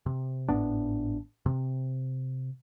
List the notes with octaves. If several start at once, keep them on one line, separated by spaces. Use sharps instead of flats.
C3
G#1 A2 B3 D4
C3